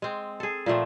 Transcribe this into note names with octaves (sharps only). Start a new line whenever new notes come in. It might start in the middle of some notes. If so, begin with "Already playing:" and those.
G#3 C4
G#4 A4
A#2 F3 A3 C4